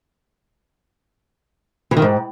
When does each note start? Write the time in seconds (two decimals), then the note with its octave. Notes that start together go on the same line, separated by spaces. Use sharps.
1.91 E3
1.97 D#3
2.02 G#2